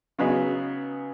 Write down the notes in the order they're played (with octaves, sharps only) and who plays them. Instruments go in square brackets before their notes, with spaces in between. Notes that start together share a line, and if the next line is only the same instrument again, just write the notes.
[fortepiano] C#3 F#3 B3 D#4 G#4